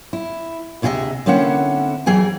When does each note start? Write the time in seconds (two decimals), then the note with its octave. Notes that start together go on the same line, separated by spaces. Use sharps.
0.13 E4
0.82 D2 C3 E4 G#4 D#5 E5
1.26 D3 A#3 C4 C#4 E4 F#5
2.06 F2 E3 F#3 G#4 G5 G#5